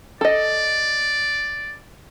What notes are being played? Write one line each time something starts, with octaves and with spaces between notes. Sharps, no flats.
A4 D5 D#5